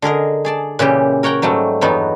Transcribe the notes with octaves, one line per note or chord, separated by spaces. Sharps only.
D3 G#4 A#4 D#5
G#4 D5 A5
A#2 C#3 E3 G4
A#4 C#5 F#5 G5 A#5
G#2 F#3 G3 A3
E2 G2 F#3 B3 D#4